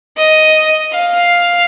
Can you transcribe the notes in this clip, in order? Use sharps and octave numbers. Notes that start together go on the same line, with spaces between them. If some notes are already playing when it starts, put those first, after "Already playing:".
D#5
F5